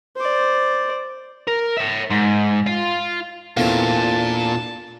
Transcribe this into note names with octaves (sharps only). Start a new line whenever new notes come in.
C5 D5
A#4
C#5 E5
G#2
F4
E2 A#2 A3 C4 D4 F4 F5 A5